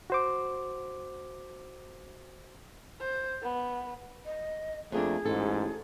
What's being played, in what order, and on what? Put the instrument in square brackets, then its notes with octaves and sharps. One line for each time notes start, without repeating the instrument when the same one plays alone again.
[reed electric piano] F#4 C5 D6
[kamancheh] C5
B3
[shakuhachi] D#5
[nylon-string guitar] F2 A#3 D4 [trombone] A3 [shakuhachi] G#4
[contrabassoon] A1 [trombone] G#2 [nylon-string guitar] A4